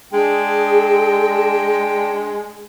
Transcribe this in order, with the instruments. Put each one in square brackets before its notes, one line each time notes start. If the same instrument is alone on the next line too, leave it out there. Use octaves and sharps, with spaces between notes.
[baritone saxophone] G#3 [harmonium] D4 G5 [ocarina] G#4